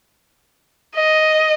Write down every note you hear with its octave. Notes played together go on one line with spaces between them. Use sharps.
D#5